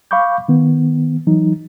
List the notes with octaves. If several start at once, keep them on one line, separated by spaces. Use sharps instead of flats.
F5 B5 C#6 D6 G6
D#3 B3
E3 F#3 D#4